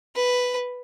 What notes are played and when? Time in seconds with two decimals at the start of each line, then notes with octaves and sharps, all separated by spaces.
0.15 B4